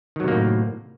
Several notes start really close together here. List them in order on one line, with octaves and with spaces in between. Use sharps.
D#3 F#3 C3 A#3 A2